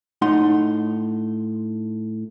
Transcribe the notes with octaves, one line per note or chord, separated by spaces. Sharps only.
A2 D#4 F#5 C6